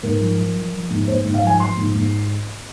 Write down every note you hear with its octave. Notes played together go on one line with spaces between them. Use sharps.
G#2 A#4
F3
F3
F3
F3
G#2
G#2 C5
G#2
F5
F3 G#5
F3 C6
G#2
G#2